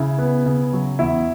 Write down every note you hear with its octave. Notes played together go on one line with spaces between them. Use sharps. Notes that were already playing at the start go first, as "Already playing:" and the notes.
Already playing: C#3 E4
B3
C#3
F#3
E2 E4